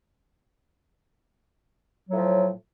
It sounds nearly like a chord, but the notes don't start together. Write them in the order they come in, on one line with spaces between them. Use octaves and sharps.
F#3 A2 F3